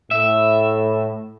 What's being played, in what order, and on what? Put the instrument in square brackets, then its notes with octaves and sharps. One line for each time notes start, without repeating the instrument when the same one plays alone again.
[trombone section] A2 [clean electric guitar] E5